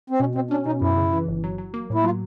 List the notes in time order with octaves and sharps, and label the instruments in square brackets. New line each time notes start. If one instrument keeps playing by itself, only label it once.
[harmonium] C4
[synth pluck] B2 [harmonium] C#4
[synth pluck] B2 [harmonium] C4
[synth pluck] C#4 [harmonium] D4
[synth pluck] B2 [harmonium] D#4
[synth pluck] F#2 [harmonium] E4
[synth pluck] C#3
E3
G1
F#3
F#3
A#3
[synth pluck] A2 [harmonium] E4
[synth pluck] F#3 [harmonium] F4